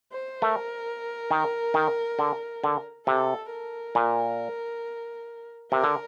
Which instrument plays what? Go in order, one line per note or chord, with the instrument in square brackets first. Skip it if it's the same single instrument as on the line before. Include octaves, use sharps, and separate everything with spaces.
[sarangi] C5
[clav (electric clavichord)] A3 [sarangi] A#4
[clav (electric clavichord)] D#3
D#3
D3
D3
[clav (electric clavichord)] C3 [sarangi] A4
[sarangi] A#4
[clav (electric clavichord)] A#2
[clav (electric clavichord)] C3 [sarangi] A#4
[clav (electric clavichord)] D3